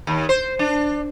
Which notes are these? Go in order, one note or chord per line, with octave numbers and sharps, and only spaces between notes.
D#2
C5
D4